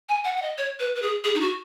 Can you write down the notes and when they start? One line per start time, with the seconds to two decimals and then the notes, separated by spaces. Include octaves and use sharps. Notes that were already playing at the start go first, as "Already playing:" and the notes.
0.09 G#5
0.24 F#5
0.36 F#5
0.42 D#5
0.58 C#5
0.79 B4
0.95 B4
1.02 G#4
1.24 G#4
1.34 D#4
1.40 F#4